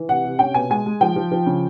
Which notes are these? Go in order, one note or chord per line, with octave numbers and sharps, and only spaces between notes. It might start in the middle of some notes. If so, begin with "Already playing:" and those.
Already playing: E3
C3 F#5
C3
C#4 G5
B2 G#5
G#3 G#5
G#3
F3 G5
F3
F3
C#3